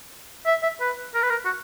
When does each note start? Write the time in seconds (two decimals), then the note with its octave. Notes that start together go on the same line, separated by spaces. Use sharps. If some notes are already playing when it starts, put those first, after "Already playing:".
0.46 E5
0.63 E5
0.80 B4
1.14 A#4
1.22 B4
1.30 A#4
1.45 F#4